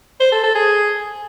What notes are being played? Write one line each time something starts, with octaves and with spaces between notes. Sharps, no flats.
C5
A4
A4
G#4